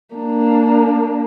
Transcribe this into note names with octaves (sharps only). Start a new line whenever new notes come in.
A#3 D4